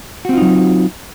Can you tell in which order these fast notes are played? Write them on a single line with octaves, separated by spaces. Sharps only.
F#4 C4 F4 D#4 F#3